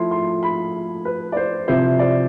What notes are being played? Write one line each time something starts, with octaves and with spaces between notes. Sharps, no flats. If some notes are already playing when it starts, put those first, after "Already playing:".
Already playing: F3 A3 E4 C6
C6
B5
B4
D5
C5
C3 F3 C4 E4 C5
D5